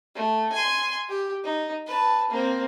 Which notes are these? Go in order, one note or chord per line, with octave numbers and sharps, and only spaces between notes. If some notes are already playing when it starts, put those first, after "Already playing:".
A3
G#5 C6
G4
D#4
B4 A5
A#3 C4